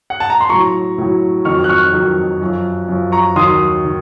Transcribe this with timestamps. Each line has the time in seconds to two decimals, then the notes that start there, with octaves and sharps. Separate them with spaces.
0.10 F#5
0.20 A5
0.30 A#5
0.40 C6
0.49 A2 F#3 A#5 C#6
0.98 A2 F#3
1.45 F2 D#3 F#3 C#6 F6
1.64 F#6
1.69 C#6 F6
1.93 F2 D#3 F#3
2.41 F#2 F3
2.88 F#2 F3
3.12 A#5 C#6
3.36 D#2 D#3 F#3 C6 D#6
3.85 D#3